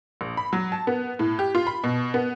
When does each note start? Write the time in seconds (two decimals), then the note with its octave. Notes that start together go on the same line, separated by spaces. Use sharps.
0.21 A#1
0.37 B5
0.53 F#3
0.72 A5
0.87 B3
1.19 A2
1.39 G4
1.55 F4
1.67 B5
1.84 B2
2.14 B3